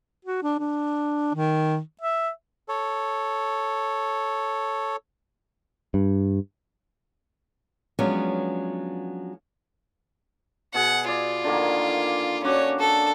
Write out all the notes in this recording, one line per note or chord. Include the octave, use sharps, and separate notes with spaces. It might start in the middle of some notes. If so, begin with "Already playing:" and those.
F#4
D4
D4
D#3
E5
A4 C#5
G2
F3 F#3 G#3 B3 C#4 D4
B2 G#4 F#5
F4 D5
D3 D#3 A#3
C#4 D4 F#4 C#5 D6
A4